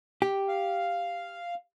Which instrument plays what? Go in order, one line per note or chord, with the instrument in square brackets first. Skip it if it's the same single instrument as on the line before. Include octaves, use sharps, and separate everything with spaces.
[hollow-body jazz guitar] G4
[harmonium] F5